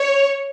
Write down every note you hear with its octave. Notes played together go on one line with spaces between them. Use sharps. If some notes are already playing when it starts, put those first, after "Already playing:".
Already playing: C#5